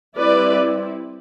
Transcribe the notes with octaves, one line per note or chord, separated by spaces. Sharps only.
G3 C4 E4 B4 D5